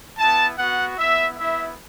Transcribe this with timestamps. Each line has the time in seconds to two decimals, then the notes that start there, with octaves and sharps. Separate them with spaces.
0.19 B3 E4 A5
0.59 B3 F#4 F#5
0.97 B3 E4 E5
1.37 B3 E4 E5